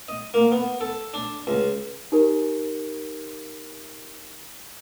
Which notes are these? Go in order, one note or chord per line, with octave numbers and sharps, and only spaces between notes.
D#5
A#3
B3
A4
D4
C#2
D#4 G4 A#4